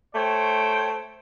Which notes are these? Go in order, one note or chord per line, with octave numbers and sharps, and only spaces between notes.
A3 C5 C#5 G5